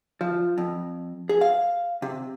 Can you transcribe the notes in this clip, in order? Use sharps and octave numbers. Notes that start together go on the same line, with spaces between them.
F3
F2
G#4
F5
C3